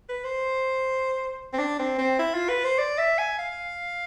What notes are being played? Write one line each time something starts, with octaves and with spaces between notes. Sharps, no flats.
B4
C5
C4
D4
C4
C4
E4
F4
B4
C5
D5
E5
G#5
F5